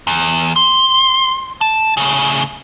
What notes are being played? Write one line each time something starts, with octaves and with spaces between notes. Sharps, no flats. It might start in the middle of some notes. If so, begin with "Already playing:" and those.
E2
C6
A5
A2 C#3